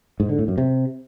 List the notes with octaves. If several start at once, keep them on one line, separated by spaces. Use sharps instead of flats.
G#2
D3
A2
F#2
C3